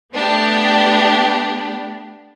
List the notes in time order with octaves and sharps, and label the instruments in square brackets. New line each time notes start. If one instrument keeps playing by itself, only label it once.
[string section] A3 B3 D4 G4